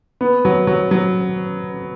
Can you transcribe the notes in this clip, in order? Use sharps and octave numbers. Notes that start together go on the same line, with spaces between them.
B3
F#3
F#3
F#3